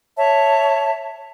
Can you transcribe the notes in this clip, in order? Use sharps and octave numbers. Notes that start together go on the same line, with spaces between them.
C#5 E5 A5